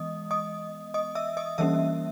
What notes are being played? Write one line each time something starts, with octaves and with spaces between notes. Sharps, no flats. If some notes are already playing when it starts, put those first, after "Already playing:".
Already playing: E3 G#3 B3 D#5 D#6
D#5 D#6
D#5 D#6
E5 E6
D#5 D#6
E3 G3 A#3 C#4 E5 E6